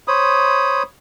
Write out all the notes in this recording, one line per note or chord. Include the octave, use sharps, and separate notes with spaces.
C5 C#5 B5 D#6